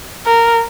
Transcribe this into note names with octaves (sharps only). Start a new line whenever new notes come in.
A#4